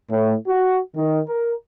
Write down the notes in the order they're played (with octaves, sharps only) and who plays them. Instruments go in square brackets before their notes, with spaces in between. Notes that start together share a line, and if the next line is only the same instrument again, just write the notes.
[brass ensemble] A2
F#4
D#3
A#4